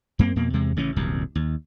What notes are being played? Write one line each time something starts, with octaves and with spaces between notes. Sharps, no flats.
F#2 A#3 C4
F2 B2 A#3
E2 C3 G#3
A1 C#3 E3 C#4
D#1 C2 F#2
D#2